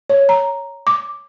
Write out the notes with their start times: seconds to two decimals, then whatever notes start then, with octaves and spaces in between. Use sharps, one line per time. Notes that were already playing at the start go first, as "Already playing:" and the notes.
0.10 C#5
0.29 A#5
0.87 D6